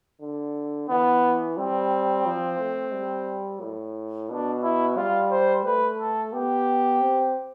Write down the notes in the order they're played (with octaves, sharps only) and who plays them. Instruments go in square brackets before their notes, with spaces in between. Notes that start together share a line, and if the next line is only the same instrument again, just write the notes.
[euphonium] D3
[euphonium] E3 [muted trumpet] B3
[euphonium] G3 [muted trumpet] C4
[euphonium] F3
A3
G3
A2
[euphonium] B2 [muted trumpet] D4
[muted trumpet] E4
[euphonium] G3 [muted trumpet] F4
[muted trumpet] C5
[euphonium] A3 [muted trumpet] B4
[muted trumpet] A4
[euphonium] B3 [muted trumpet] G4
[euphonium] C4